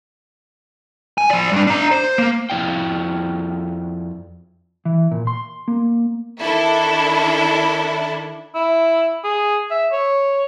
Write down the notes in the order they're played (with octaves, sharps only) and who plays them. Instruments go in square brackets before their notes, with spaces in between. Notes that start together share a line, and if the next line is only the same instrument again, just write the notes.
[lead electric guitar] G#5
F3 D5
G2 D4
D4 A#5
C5
A#3
[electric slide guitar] F2 G#3 E4 D5 F5 G5
[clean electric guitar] E3
A#2
C6
A#3
[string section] D#3 D4 E4 A4
[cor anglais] E4
G#4
E5
C#5